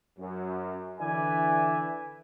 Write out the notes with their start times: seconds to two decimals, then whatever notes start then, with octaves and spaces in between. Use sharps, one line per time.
0.18 F#2
0.99 D3 E3 B4 D5 E5 G#5